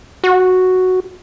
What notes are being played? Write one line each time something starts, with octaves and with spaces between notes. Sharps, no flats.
F#4